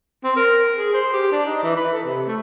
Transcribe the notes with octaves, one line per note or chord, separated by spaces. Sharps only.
C4
A#4
G#4
C5
G4
D4
D#4
E3
B4
A4
C3
A3